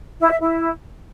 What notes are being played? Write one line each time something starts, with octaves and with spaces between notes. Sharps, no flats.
E4
E5
E4